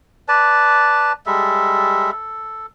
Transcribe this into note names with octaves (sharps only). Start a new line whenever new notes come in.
B4 D5 A5
G3 G#3 A4 E5
A4